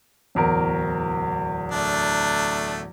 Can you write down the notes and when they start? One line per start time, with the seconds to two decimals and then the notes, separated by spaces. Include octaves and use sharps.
0.35 D1 E2 A#4
1.72 A3 D4